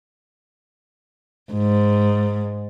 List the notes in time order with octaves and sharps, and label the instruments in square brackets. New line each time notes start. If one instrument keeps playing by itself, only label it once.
[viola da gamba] G#2